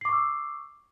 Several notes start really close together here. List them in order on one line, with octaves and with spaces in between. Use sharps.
C7 D6 C#6 E6